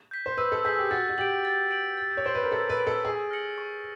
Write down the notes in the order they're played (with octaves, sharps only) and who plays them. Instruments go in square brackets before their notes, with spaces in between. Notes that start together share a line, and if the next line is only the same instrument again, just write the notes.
[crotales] G6 B6
[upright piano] C5
[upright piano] B4 [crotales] E6
[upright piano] A4
[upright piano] G#4 [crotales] G6 B6
[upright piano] G4
[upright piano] F#4 [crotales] A6
[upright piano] F#4
[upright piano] G4 [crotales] D7 F#7
[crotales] A6
D7 F#7
A6
[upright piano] C#5
[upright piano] C5 [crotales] D7 F#7
[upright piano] B4
A#4
[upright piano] A4 [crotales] A6
[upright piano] B4
[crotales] D7 F#7
[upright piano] A4
[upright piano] G#4 [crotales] C#6
[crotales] F6 A#6 C#7 F#7
C#6